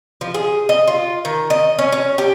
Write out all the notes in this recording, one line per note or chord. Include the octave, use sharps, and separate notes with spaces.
F3
G#4
D#5
F4
D#3
D#5
C#4
C#4
G4